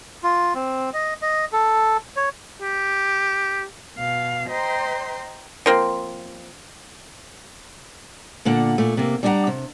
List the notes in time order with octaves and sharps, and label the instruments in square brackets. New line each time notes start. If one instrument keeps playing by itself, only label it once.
[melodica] F4
C4
D#5
D#5
A4
C#5
[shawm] G4
[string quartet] B2 F5
C5 D#5 G5 A#5 C6
[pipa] F3 A#3 C4
[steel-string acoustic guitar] A#2 D3 A#3 F#5
A#2 A3
C3 A#3
G3 D4 D5 D#5 F#5 A#5
C3